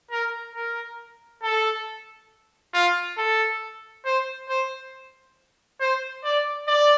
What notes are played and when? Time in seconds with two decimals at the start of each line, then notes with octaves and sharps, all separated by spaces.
0.11 A#4
0.55 A#4
1.43 A4
2.74 F4
3.18 A4
4.05 C5
4.49 C5
5.80 C5
6.24 D5
6.68 D5